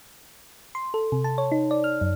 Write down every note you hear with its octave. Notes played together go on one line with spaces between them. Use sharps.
C6
A4
C3
A5
C#5
D#4
D5
F6
F#2